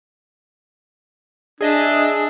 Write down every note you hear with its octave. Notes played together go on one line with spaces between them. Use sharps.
D4 G#4 D#5 E5